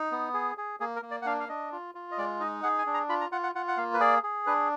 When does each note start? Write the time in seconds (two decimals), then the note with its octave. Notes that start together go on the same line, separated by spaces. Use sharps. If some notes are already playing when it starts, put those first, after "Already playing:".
Already playing: D#4
0.12 B3
0.34 G#4
0.58 G#4
0.80 A#3 G#4
0.96 A#4
1.02 A#3
1.11 D5
1.22 F#5
1.26 D4 F5
1.40 F5
1.49 D4 D#5
1.72 F4
1.95 F4
2.11 D#5
2.18 G#3 D5
2.40 D#4 D#5
2.63 G#4 F#5
2.79 G#5
2.87 D4
2.94 A#5
3.09 F4 B5
3.21 A#5
3.32 F4 F#5
3.43 F#5
3.55 F4 F#5
3.68 F#5
3.77 A#3 F5
3.94 B4
4.00 G#4 D5
4.23 G#4
4.46 D4 B4